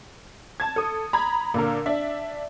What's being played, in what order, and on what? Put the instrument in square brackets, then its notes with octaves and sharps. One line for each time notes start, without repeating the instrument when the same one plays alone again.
[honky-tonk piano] A5 G#6
A4 D#6
A#5 B5 G#6
A#2 D3 A#4
D4 E5